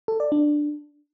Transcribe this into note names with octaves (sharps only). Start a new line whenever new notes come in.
A4
D5
D4